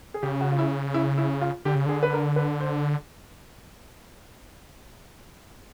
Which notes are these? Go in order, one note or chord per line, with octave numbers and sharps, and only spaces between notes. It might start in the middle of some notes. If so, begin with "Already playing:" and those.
G#4
C#3 G4
F#4
F4
E4
E4
E4
F4
D3 G4
C#3
D3 G#4
B4
A#4
B4
C5